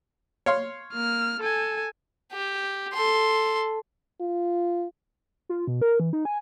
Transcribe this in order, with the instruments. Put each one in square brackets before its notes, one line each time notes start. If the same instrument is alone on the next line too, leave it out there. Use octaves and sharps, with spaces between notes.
[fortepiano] C#5 F5 C6
[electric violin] A#3 F6
A4 G#5
[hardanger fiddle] G4
A4 C6
[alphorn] F4
[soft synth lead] F4
B2
A#4
E3
D#4
G#5